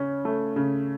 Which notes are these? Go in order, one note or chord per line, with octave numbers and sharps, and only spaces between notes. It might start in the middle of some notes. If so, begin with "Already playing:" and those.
Already playing: C#3 C#4
A3
C#3